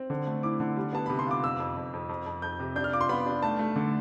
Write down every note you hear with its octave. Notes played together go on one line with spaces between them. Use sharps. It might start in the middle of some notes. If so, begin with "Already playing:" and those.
Already playing: C4
D3
A3
E4 D6
D3
G3
B3 A5
C3 B5
C6
F4 D6
F2 E6
F2
F2
F2
F2
F2
F2 G6
C3
D4 G6
F6
F4 D6
C6
B3 B5
D4
A3 A5
A3
D3